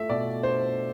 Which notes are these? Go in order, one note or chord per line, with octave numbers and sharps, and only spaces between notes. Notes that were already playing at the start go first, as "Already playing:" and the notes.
Already playing: A3 F4 E5
B2 D5
D4 C5